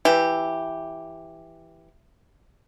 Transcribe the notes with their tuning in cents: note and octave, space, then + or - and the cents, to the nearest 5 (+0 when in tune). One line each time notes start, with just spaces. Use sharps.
E3 +0 G4 +0